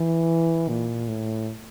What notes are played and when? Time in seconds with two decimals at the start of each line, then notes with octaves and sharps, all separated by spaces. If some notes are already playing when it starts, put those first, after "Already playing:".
Already playing: E3
0.68 A#2
1.08 A2